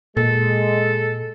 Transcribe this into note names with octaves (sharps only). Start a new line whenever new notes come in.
A#2 G#3 A4